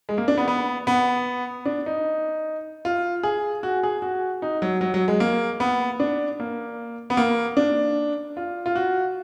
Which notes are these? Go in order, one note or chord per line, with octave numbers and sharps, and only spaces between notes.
G#3
A#3
D4
B3
B3
B3
D4
D#4
F4
G#4
F#4
G#4
F#4
D#4
F#3
F#3
F#3
G#3
A#3
B3
D4
A#3
B3
A#3
D4
F4
F4
F#4